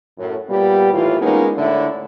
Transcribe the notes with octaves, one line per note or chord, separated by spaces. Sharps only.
F#2 A2
A#2 G3 B3 G4
D#2 A2 E3 F4
G#3 A#3 B3 C#4 D#4
A2 D3 E4